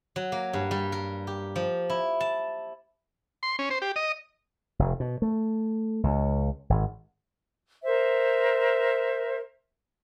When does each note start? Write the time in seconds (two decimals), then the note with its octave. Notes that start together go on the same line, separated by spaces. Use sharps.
0.16 F#3
0.32 A#3
0.53 G2
0.71 G3
0.92 A#4
1.27 G4
1.56 F3
1.90 E4
2.20 A5
3.43 C6
3.59 C#4
3.70 C5
3.82 G4
3.96 D#5
4.79 F1
5.00 B2
5.22 A3
6.03 C#2
6.70 G#1
7.84 A#4 C5 E5